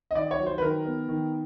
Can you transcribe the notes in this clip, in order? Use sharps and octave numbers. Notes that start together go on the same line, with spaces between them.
D#5
D#3 D5
C#5
F#3
C5
B4
D#3 A#4
B3
D#3